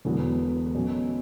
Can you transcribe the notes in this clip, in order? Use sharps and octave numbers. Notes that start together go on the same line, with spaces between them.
E1 E2 D3 F#3 B3
B2 F#3 A3 C#4